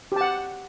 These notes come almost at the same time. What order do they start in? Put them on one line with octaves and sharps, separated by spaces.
G4 A5 F#5